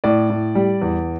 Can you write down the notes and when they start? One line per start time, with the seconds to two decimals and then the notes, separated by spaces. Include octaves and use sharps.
0.04 A2 D5
0.30 A2
0.55 G3
0.81 E2